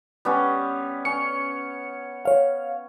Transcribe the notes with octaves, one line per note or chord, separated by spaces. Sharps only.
G3 B3 C#4
C#4 C#7
C#5 F5